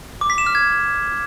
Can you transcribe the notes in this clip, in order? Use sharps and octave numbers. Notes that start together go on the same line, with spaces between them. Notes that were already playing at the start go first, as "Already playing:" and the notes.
D6
B6
E7
F6
G#6